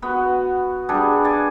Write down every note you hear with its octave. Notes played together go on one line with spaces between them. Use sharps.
B3 F#4
G3 D4 G#4
D5 G#5